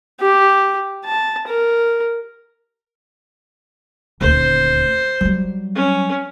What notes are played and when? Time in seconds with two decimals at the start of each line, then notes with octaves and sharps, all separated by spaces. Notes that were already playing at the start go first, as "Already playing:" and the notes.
0.20 G4
1.05 A5
1.47 A#4
4.21 D#1 D2 C5
5.21 F#3 G3
5.75 C#4